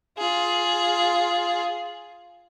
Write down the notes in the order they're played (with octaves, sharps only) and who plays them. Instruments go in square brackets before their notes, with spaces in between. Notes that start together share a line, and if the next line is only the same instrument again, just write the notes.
[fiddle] F4 G#4